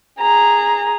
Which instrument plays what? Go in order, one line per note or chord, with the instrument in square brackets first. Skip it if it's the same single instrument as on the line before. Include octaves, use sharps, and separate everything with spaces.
[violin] G#4 A#5